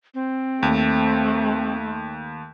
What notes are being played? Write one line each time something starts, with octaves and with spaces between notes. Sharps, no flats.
C4
D#2 A3